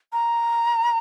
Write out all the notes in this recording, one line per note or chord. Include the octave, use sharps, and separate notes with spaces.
A#5